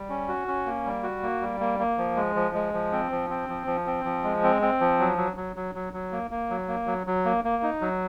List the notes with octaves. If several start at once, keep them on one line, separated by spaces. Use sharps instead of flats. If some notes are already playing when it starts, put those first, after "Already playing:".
Already playing: G3
C#4
F#4
C#4
A#3
G3
F#4
A#3
G3
A#3
A#3
F3
G#3
F3
G#3
F3
C4
F3
C4
F3
F3
C4
F3
G#3
C4
C4
F3
F#3
F#3
F#3
F#3
F#3
F#3
A#3
A#3
F#3
A#3
F#3
F#3
A#3
A#3
D#4
F#3